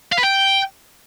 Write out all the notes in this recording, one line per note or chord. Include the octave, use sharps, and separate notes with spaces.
F5
B4
G5